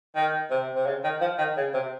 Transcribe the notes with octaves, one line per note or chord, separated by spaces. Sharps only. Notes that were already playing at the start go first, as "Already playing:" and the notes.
D#3
C3
C3
C#3
D#3
F3
D#3
C#3
C3